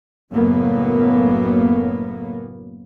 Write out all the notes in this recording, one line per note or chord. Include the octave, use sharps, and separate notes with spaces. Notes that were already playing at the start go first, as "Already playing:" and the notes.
F#1 F#2 A2 A#3 B3